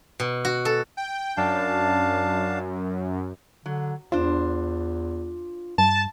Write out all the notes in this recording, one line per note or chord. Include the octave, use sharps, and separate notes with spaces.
B2
F#4
A4
G5
F#2 D4 F5 A5
D3 F#3
E2 D4 F4 C5
G2 A5